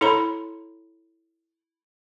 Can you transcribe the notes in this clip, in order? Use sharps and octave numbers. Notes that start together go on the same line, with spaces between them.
E4 A4 C#5 A#5 B5